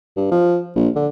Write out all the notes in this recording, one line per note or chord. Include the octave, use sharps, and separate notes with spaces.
G2
F3
A#1
D3